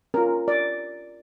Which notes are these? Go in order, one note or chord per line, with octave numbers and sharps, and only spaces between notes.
C#4 F4 A#4
D5